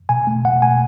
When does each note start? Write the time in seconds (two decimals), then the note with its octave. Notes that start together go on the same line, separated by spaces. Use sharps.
0.09 B2 G#5
0.27 A3
0.45 B2 F#5
0.62 A3 G#5